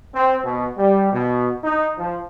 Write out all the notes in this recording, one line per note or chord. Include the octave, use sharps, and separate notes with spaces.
C4
B2
G3
B2
D#4
F3